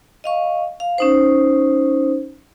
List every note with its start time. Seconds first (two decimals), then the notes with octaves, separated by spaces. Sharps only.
0.24 D#5 F5 C#6
0.80 F5
0.98 C#4 D#4 C5